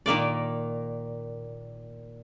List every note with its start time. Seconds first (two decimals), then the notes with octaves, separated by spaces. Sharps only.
0.06 A#2 D#3 A#3 D5